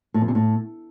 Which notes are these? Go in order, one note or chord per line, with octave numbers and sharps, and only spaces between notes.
A2
F2
C3
A2